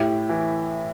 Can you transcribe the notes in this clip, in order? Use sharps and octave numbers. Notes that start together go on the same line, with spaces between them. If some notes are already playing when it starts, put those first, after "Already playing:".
Already playing: A2 E4 G4
E3